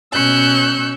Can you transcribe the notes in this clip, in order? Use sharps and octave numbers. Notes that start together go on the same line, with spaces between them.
B2 C#4 C#6 E6 F#6 G6